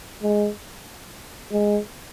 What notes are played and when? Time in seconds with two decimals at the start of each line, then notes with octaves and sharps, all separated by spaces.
0.22 G#3
1.51 G#3